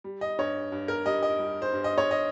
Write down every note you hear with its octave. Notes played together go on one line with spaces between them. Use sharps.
G3
D#5
G2 C#5
G2
A#4
G3 D#5
D#5
G3
C5
G2
D#5
C#5
D#5